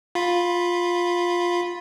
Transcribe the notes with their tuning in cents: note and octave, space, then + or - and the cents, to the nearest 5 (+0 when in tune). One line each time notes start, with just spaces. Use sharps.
F4 +10 B5 +0